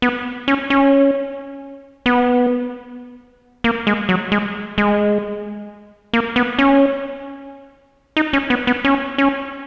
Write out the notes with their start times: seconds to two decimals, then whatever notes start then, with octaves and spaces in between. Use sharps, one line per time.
0.02 B3
0.48 C#4
0.70 C#4
2.06 B3
3.64 A#3
3.87 G#3
4.09 F#3
4.32 G#3
4.78 G#3
6.14 A#3
6.36 B3
6.59 C#4
8.17 D#4
8.33 C#4
8.50 B3
8.67 B3
8.85 C#4
9.18 C#4